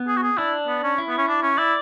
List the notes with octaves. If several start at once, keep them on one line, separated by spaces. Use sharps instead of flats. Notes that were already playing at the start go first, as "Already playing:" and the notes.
Already playing: B3
G#4
F#4
G#4
D4 E4
B3
C#4
E4
B3
C#4
D4
C#4
E4 D5